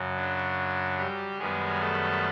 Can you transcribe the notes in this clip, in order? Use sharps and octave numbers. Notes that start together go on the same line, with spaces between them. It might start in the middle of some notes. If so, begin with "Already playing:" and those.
Already playing: F#2 C#3 F#3
D4
G3 G4
F#2 D#3 G3 G#3 B3 G#4
A3 A4